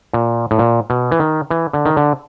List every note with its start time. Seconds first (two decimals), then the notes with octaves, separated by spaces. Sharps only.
0.13 A#2
0.51 A2
0.59 A#2
0.90 B2
1.12 E3
1.20 D#3
1.50 E3
1.73 D3
1.86 D#3
1.97 D3